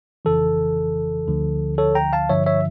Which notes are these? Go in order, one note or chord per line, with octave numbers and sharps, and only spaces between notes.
G1 F2 C#3 E3 A4
D2 D3 F3
A4 C#5
G5 A#5
F5 A5
G1 G2 D3 F3 C#5 E5
C#5 E5